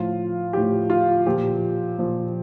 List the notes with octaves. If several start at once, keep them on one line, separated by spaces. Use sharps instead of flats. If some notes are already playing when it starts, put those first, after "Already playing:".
Already playing: A2 F3 F4
A2 F3 G4
F4
A#2 F3 G4
A#2 F3